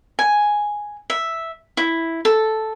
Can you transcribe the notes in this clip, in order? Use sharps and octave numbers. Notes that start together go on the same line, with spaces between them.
G#5
E5
E4
A4